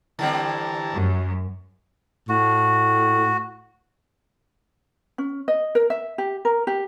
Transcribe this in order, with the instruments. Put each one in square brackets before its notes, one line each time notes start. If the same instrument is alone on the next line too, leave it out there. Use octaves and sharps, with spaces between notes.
[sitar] D3 G3 C4 [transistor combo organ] E3 A5 A#5
[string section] F#2
[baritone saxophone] A2 [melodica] F#4
[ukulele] C#4
D#5
A#4
E5
G4
A#4
G4